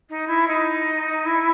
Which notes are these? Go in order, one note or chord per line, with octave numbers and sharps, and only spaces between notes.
D#4
E4
D#4
E4